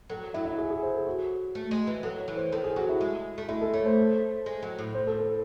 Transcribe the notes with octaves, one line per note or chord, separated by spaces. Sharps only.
F#3 A4
F#3 E4
E4
G#4
G#4
C5
A4
F#4
A3
G#3
E3
F#3 A4
C#5
E3
C5
D#3 A4
G#4
F#3 F#4
E4
G#3
A3
G#3 E4
A4
A3 C#5
C5
G#3
F#3
A2
C5
A4
A4